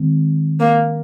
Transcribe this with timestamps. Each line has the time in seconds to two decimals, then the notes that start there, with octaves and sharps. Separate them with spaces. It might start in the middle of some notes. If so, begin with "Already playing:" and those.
Already playing: D#3 G#3 C4
0.60 A#3